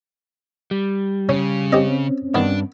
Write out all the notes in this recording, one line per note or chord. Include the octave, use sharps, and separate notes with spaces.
G3
C#3 C#4
C4 C#4 G4 D#5
G2 D#3 B3 D4